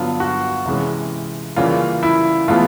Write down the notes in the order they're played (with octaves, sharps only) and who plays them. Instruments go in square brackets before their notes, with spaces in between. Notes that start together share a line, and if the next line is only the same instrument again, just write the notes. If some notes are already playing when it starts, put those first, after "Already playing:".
Already playing: [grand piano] G2 D3 F#3 B3 F4
F#4
C3 E3 G#3 C#4
C#3 E3 G3 A#3 C#4 F4
E4
A2 E3 G#3 B3 F4